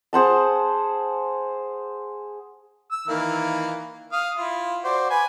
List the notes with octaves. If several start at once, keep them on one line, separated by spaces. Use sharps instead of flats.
G#4 C5 F#5 A5
E6
D#3 E3 A#3
F5 D#6
E4 F4
F#4 C5 D5
B4 G#5